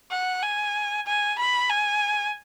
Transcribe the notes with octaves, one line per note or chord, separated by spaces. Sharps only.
F#5
G#5
G#5
B5
G#5